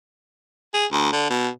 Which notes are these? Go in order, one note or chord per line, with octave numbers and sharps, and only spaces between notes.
G#4
D2
D3
B2